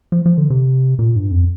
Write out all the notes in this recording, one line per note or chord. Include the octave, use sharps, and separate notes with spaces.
F3
F3
D3
C3
A#2
G2
F2